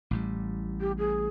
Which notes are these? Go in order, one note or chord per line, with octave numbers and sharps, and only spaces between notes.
A1 A2 G3
G4
G#4